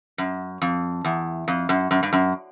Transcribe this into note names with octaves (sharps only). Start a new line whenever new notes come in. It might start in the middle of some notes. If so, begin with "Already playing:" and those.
F#2
F2
E2
F2
F#2
F#2
G2
F#2